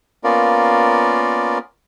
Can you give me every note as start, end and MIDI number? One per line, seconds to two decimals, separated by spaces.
0.24 1.58 58
0.24 1.58 59
0.24 1.58 61
0.24 1.58 65
0.24 1.58 70
0.24 1.58 74